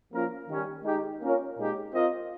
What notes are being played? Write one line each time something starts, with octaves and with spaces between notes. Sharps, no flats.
F3 A#3 C#4 F4 A#4
D#3 G3 C#4
G#3 D#4 G4
A#3 C#4 F4 A#4 C#5
A#2 G#3 D#4 G4
C4 F4 A#4 D#5